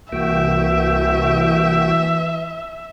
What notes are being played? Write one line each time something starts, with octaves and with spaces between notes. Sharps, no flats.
C2 E3 A#3 F#4 E5 G5